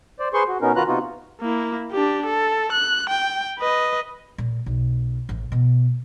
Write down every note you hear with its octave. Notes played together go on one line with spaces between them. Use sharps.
C5 D5
G#4 B4 C5 C6 C#6
F#4
B2 B3 C#4 D#4 A#4
D#3 F4 F#4 B4 A#5 F#6
C3 B3 D#4 F4 F#4
A#3 E4
D4 G4
A4
F#6
G5
B4 D#5
A#2
B1
A1
B2